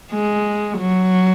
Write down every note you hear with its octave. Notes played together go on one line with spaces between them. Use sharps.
G#3
F#3